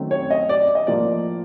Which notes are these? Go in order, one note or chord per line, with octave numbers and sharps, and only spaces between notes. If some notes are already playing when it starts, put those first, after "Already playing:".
Already playing: F#2 D#3 F#3 A3 C4
C#5
D#5
D5
D#5
A2 F3 A#3 D5